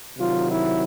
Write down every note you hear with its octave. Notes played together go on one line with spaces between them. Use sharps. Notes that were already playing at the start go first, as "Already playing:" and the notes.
C3 D#3 F#3 F4
E4